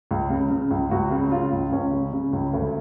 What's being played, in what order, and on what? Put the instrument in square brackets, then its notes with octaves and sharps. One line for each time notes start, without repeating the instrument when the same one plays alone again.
[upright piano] C#2
C#3
C#3
C#2
C#2 F#4
C#3
C#3 F4
C#2
C#2 C#4
C#3
C#3
C#2
D2